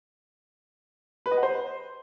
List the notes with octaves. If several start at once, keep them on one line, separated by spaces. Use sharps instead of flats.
B4
D#5
F#5
C5